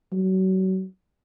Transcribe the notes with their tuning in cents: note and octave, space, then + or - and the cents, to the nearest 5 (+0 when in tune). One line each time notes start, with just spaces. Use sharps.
F#3 +30